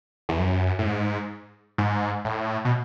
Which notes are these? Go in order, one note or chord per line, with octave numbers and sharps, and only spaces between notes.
E2
F#2
A2
G#2
G#2
A2
B2